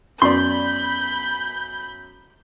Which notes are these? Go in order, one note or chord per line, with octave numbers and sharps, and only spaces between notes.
F#2 B3 D5 B5 C6 G6